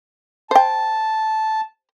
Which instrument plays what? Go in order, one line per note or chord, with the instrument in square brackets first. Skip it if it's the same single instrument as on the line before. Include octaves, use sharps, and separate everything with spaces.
[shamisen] C5 G5 [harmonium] A5